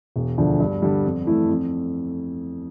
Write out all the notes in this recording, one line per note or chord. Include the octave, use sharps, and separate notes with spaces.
E1
D2 D3 F3
G2
D3 G3
F2
E3 A3 E4
F2